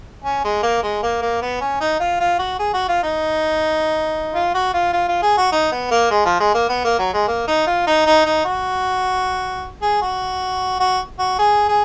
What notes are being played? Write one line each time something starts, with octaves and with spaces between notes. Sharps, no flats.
C#4
G#3
A#3
G#3
A#3
A#3
B3
C#4
D#4
F4
F4
F#4
G#4
F#4
F4
D#4
F4
F#4
F4
F4
F4
G#4
F#4
D#4
B3
A#3
G#3
F3
G#3
A#3
B3
A#3
F#3
G#3
A#3
D#4
F4
D#4
D#4
D#4
F#4
G#4
F#4
F#4
F#4
G#4
G#4